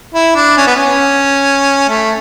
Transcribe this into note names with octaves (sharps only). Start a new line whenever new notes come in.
E4
D4
C#4
B3
C#4
A3